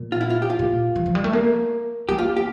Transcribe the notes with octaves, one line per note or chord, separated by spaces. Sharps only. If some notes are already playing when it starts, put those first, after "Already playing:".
Already playing: A#2
F4
E4
F4
G4
F4
A#2
E3
F3
G3
A3
A#3
A#3 G4
F4
G4